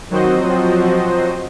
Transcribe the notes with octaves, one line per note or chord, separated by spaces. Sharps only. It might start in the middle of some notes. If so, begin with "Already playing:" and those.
D#3 F#3 C4 F#4 C5 D#5
F3